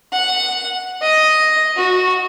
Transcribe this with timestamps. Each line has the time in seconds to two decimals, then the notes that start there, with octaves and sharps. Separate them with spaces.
0.13 F#5
1.02 D#5
1.76 F#4